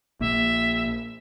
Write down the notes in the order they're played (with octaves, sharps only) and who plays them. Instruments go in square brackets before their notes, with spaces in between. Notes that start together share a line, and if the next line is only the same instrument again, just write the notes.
[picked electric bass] A#1 A#3 [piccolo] E5